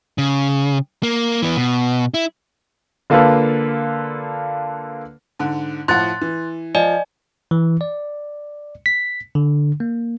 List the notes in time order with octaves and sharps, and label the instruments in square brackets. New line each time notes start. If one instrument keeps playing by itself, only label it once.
[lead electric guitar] C#3
A#3
E3 B3
B2
E4
[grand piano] D3 A#3 F4 A4 B4
[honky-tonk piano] G#2 D3
[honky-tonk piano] A2 F3 F#5 [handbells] C6 F#6 A6
[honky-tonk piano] E3
[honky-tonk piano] F3 [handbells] D5 D#5 G#5
[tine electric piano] E3
D5
B6
D3
A#3